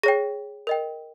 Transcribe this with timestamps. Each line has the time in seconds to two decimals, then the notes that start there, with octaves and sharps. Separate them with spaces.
0.03 G#4 C#5 G5 A#6
0.67 A#4 D#5 G5